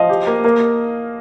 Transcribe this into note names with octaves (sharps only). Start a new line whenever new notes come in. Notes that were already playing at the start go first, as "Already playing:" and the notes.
Already playing: F3 D#5 F5
G4
A#3
A#3